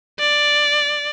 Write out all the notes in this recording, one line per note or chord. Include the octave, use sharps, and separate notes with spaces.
D5